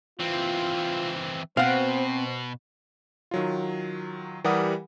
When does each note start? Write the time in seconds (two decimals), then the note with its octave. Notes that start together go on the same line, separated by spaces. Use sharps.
0.19 E3 C4 F4
1.57 B2 C4 C5 F5 F#5
3.31 D#3 F#3 F4
4.44 E3 G3 G4 A#4 F#5 D#6